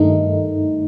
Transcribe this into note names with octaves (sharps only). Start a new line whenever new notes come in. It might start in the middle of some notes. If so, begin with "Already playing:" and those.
Already playing: G2 D#3 A3 D#4